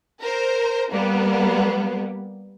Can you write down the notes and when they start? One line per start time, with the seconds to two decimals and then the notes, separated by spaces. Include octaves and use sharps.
0.22 A#4 C5
0.91 G3 A#3 B3